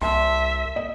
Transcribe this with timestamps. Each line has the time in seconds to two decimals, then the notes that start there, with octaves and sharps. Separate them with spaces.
0.01 C2 E5 A5 C6
0.76 D#5